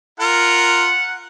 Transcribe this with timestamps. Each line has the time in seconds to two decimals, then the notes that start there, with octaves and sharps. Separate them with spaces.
0.20 F4 A#4 F#5